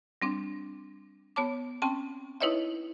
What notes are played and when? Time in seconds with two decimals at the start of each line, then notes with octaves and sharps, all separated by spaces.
0.22 G3 C4 D4
1.36 B3 C#5 A5 D6
1.82 C4 C#4 G5 A5
2.41 D#4 E4 B4 C#5 D#5 E5